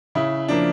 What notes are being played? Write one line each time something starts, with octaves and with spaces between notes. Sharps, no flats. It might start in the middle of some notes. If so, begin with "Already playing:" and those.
C#3 E4
F3 A#3 D4